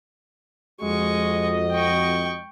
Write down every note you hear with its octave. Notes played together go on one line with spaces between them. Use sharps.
F2 G#3 F#4 D#5 C#6
G5 C#6